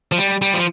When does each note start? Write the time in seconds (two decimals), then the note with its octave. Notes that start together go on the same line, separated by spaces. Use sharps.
0.12 F3
0.18 G3
0.42 G3
0.54 F3